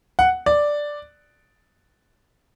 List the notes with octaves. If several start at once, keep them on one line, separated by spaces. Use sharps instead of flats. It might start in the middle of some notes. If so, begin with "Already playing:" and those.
F#5
D5